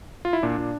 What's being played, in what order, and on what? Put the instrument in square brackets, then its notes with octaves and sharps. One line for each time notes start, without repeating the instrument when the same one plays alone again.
[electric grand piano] F4
E4
A#2 D4
A#2